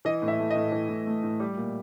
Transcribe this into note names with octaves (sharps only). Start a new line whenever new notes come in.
E3 D#5
A2
E5
A3
D#5
A2
E3
A2
A3
A2
G3
A#2